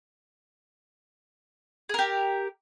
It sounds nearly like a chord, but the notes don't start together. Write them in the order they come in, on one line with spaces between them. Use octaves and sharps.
G#4 A#4 G4